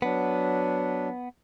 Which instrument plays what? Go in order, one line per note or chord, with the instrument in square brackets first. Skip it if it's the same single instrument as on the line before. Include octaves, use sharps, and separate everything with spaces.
[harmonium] F#3 D4 [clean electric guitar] B3